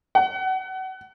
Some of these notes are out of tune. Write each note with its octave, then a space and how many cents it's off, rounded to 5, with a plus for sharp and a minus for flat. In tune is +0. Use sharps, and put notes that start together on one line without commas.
F#5 +30